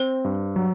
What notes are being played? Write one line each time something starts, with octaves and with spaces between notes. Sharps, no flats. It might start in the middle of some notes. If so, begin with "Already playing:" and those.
Already playing: C4 C5
G2
F#3